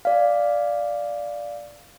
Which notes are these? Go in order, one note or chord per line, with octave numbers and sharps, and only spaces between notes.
D5 F5